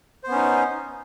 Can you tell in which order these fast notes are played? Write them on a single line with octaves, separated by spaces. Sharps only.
C5 B3 C#4 D#4